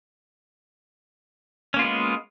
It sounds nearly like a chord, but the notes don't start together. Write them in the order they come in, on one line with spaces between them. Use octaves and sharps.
C#4 A#3 F4 B3 G#3